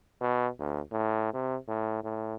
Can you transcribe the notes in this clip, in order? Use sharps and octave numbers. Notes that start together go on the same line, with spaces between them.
B2
D2
A2
C3
A2
A2